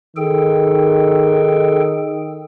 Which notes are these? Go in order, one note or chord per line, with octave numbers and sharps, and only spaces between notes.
D#3 G#4 A4 G5